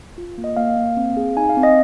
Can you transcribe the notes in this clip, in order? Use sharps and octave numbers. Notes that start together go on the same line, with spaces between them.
F4
A#3
D#5
A#3 F5
A#3
C4
G#4
D#4 G#5
F5
C4
D#5